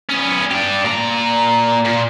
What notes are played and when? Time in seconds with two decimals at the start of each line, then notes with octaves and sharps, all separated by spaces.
0.09 B3 C#4
0.51 D4 G4
0.85 A#2 A#5
1.85 A#2